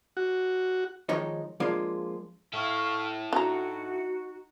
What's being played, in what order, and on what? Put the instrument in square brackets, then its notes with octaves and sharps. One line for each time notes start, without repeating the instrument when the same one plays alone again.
[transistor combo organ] F#4
[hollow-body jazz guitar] D#3 F3 G#3 D#4 C#5
F3 G#3 A#3 D4 F4
[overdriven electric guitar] E4 A4 [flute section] F5 C#6 F6
[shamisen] D4 A#5 [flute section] D#4 F#4